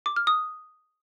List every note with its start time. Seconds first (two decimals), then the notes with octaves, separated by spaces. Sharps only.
0.06 D6
0.16 F6
0.27 D#6